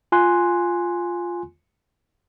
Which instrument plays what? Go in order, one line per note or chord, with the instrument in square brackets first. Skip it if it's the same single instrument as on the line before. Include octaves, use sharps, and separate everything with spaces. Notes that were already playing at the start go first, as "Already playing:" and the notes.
[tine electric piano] F4 G#5 C6 F#6